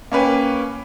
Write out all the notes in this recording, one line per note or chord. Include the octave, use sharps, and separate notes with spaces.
A#3 C#4 B4 G5